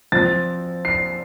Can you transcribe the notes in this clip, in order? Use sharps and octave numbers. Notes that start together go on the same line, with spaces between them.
F3 C4 A6
C7